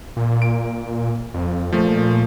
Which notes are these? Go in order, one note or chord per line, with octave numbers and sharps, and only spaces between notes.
A#2
D7
F2
A#2 F3 A3